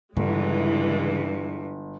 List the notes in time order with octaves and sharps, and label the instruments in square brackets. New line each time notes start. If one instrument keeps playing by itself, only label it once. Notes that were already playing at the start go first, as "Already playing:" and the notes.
[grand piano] G1 [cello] G2 [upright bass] C#3 [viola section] E3 G#3